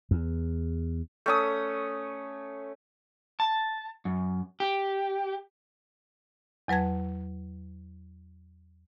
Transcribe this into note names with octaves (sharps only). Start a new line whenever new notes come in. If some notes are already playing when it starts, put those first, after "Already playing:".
E2
A3 C#4 D#6
A5
F#2
G4
E2 F#3 B4 A5 G#6